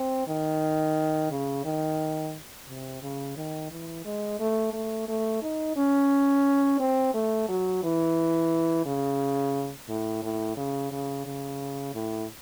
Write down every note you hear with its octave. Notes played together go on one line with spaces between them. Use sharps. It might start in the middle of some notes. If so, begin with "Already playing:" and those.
Already playing: C4
D#3
C#3
D#3
C3
C#3
D#3
E3
G#3
A3
A3
A3
D#4
C#4
C4
A3
F#3
E3
C#3
A2
A2
C#3
C#3
C#3
A2